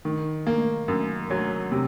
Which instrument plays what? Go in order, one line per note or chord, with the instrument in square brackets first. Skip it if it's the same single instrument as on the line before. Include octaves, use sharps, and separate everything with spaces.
[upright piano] D#3
A#3
F#2
F#3
C3